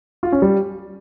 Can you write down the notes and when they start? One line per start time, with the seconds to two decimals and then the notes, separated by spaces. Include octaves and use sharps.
0.23 F4
0.32 C#4
0.42 G3